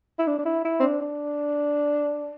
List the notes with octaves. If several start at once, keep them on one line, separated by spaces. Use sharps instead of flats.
E4
D4
D4
E4
E4
C4
D4
D4